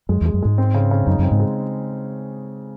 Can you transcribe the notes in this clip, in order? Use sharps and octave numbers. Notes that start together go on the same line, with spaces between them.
F#2 G#3
E2 G#3
F#2
G#2 G#3
C4
C#3
C#3
F#2 D#4
F#2 C4
G#2
G#3